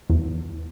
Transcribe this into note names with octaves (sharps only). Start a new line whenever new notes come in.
E2